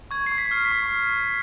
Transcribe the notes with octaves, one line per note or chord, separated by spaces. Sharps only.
C#6 G#6
C7
C#6
B6
F6
B6
C#6